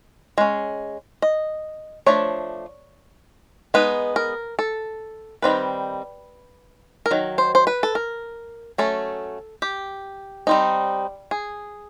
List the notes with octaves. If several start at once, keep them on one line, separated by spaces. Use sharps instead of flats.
G#3 C#4
D#5
F3 A3 D4 C#5
G#3 B3 D#4 B4
A#4
A4
D#3 G3 C4 B4
A#4
D#3 F#3
C5
C5
B4
A4
A#4
F#3 A3 C#4 A4
G4
G3 C4 D#4
G#4